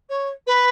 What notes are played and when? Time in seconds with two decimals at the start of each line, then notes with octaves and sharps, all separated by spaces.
0.09 C#5
0.46 B4